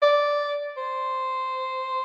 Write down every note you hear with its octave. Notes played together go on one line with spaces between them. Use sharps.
D5
C5